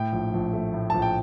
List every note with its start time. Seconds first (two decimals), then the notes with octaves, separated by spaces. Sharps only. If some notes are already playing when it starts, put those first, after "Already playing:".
Already playing: A2 G5
0.12 A#1
0.34 A#1
0.53 A3
0.74 A2
0.90 A#1 A5
1.02 G5